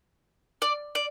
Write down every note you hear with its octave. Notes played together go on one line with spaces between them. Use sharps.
D5
D5